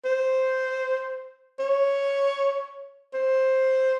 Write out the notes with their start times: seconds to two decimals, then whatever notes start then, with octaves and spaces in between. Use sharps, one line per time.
0.05 C5
1.59 C#5
3.14 C5